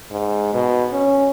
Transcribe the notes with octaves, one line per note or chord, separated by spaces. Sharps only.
G#2
B2
C#4